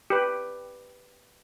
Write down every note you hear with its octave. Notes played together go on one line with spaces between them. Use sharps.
G4 B4